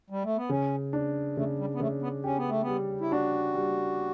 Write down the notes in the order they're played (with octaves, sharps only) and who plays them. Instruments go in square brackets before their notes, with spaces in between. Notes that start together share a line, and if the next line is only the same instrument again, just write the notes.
[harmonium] G3
A3
B3
[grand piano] C#3 [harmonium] C#4
[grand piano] D4
[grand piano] C#3 [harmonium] A3
[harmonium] G3
B3
[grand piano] C#3 [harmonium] A3
[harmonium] B3
[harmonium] C#4 [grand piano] G4
[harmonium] B3
A3
B3
[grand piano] G3
[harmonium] E4
[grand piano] D4 [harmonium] F#4
[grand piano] G3